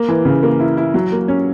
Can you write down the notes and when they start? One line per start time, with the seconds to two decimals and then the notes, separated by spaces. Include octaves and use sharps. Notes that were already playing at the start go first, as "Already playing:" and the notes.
Already playing: A#3
0.08 E3
0.25 C#3
0.43 A#3
0.60 E4
0.77 E4
0.94 F#3
1.12 A#3
1.28 C#4